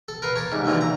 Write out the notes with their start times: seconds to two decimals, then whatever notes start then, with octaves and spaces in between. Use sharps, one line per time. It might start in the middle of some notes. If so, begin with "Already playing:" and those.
0.08 A4
0.22 A#4 B4 F5
0.36 C#5 A5 D6
0.52 C2 G#2
0.65 D#2 D3 E3 F#3 D4
0.81 A#5